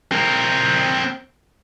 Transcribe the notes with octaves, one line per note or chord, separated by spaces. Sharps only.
C4 A#4